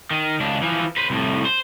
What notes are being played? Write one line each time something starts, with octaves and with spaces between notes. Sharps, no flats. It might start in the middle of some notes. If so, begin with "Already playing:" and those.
D#3
C#2 D4
E3 F3
B4 C5
C2 A2
C5